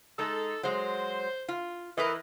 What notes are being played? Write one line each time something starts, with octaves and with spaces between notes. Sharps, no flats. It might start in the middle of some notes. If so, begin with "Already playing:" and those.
G#3 D#4 A4
F#3 G#3 C5
F4
E3 A#4 B4 D#5